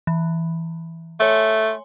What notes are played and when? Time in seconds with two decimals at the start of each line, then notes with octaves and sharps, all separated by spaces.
0.07 E3
1.20 A3 C#5 G#5 C6